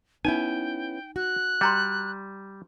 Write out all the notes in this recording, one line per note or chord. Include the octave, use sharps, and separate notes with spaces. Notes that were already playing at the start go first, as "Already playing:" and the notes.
B3 C#4 D#4 E4 G5 G#5
F#4 F#6
G3 G5 A#5 C6